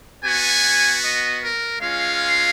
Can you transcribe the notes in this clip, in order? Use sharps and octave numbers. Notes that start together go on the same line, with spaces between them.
B3 F#4 G#5
D#5
A#4
G#3 C#4 F4 F5